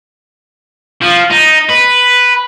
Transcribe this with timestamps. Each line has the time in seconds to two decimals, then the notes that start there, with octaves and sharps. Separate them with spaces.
1.02 F3
1.30 D#4
1.69 B4